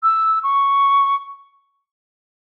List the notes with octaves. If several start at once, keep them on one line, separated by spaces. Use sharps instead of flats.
E6
C#6